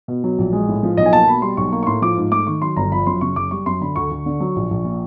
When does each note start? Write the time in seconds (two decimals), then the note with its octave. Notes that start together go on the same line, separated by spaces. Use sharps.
0.08 B2
0.24 F#3
0.38 A#1
0.53 G#3
0.68 A2
0.83 F3
0.97 B1 D#5
1.06 G#5
1.13 A#3 A5
1.27 B2 B5
1.42 G3 C6
1.57 B1 C#6
1.72 A#3 C#6
1.83 C#6
1.87 A2 C6
2.02 F3 D6
2.17 G#2
2.31 A3 D6
2.47 D#3 C#6
2.62 F#3 C6
2.76 G1 A#5
2.91 F3 B5
3.07 F#2 C6
3.21 C#3 C#6
3.36 F#1 D6
3.51 G3 C#6
3.66 F#2 C6
3.81 D3 B5
3.96 D2 C#6
4.11 D2
4.26 D3
4.40 F#3
4.56 A#1
4.71 A#1
4.85 A#2